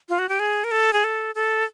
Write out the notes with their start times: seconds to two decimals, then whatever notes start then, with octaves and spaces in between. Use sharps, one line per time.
0.09 F4
0.19 F#4
0.29 G4
0.39 G#4
0.64 A#4
0.71 A4
0.93 G#4
1.04 A4
1.35 A4